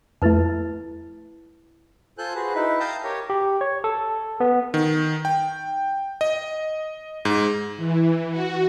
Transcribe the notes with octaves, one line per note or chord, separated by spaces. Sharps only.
F2 A3 E4 B4 A5
F4 A4 C5 G#5 F#6 G6
F#4 G#4 B4 C5
D#4 E4 B4
F5 G5 A5 A#5 D#6 G6
G4 A#4 C#5
G4
C#5
A4
B3
D#3
G5
D#5
G#2
E3
F#4